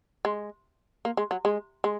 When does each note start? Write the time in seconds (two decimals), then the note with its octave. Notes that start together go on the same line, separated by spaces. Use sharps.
0.25 G#3
1.05 A#3
1.17 G#3
1.31 F#3
1.45 G#3
1.84 G#3